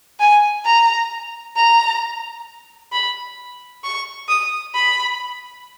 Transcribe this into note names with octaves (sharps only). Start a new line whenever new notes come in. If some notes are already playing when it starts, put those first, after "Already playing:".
G#5
A#5
A#5
B5
C#6
D#6
B5